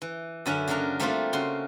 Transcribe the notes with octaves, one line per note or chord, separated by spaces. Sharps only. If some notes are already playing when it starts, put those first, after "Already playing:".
E3
F#2 D3 C#4 E5
C#3 F#3 A#3 D4 A#4
G3 A3 A#3 C4 D4 F4
C#3 F#4 C6